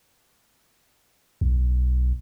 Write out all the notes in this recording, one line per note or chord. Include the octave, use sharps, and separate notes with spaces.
B1